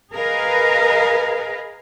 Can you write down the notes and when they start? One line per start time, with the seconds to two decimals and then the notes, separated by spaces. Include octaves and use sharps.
0.12 G#4 A#4 B4 D#5 F5